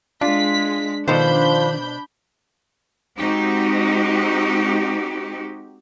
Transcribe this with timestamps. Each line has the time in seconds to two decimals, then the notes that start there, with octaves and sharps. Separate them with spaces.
0.21 G#3 D4 F4 B6
1.08 B2 D#3 F3 D4 C5 B5 G6
3.18 G#3 C4 D#4 F#4 G4